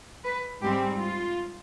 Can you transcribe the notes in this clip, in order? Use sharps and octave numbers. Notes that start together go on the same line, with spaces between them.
B4
G#2 G3 C4 G4
F4